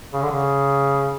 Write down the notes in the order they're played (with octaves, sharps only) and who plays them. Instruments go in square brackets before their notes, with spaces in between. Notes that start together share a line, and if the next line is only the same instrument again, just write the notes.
[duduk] C#3
D3
C#3